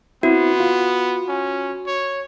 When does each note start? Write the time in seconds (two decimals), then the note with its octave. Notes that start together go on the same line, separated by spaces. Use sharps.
0.23 B3 C4 E4 F#4
0.60 F4
1.29 C#4
1.87 C#5